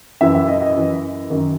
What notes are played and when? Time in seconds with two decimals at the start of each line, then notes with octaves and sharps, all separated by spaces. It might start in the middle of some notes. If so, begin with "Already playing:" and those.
0.21 F#2 E3 E5
0.35 E5
0.48 D#5
0.62 D#5
0.76 F#2 E3
1.30 F#2 D#3